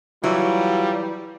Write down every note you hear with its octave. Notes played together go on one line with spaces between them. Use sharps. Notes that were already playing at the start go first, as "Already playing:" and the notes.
E3 F#3 G3 F4